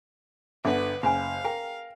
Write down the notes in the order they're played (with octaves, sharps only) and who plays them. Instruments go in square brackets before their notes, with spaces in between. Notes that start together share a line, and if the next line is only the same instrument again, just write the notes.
[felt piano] G1 D3 [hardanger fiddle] B4 [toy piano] E5 F#5
[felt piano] F#1 [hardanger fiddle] F5 [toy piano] G5 G#5 B5
[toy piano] G#4 G5 [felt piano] A#4